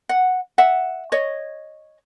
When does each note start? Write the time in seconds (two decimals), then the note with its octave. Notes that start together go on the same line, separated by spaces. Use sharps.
0.09 F#5
0.58 E5 F#5
1.12 C#5 D#5